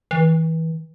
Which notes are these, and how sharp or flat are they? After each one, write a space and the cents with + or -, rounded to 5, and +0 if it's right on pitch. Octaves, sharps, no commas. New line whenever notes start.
E3 -30